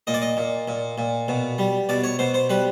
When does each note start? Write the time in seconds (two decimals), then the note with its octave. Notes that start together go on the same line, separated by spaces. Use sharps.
0.07 A#2 D#5
0.14 D5
0.22 D#5
0.37 A#2
0.68 A#2
0.98 A#2
1.28 B2
1.58 G3
1.89 B2 D5
2.04 C#5
2.19 B2 C5
2.34 C5
2.49 G3 B4